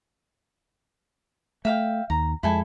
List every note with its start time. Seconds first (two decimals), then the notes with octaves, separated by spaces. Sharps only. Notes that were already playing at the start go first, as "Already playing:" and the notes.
1.65 A3 E5 F5 G5
2.10 D#2 A#5
2.43 F2 G#3 E4 A4 G#5